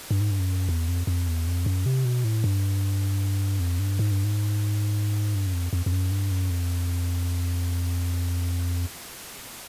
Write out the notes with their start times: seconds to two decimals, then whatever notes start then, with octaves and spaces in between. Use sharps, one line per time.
0.11 G2
0.21 G#2
0.31 G2
0.39 F#2
0.69 E2
0.88 F2
1.07 F2
1.28 E2
1.47 F2
1.66 F#2
1.86 C3
2.05 B2
2.24 A2
2.44 G2
3.60 F2
3.79 G2
3.99 G#2
4.11 G2
4.24 G#2
5.35 G2
5.46 F#2
5.54 F2
5.73 F2
5.86 F2
5.92 F#2
6.11 G2
6.31 F#2
6.50 F2